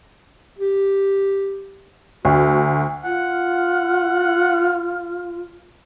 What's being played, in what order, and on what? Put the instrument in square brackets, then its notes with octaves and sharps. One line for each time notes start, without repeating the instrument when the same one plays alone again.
[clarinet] G4
[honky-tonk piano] D2 [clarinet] F#4
[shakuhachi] F4 [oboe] F#5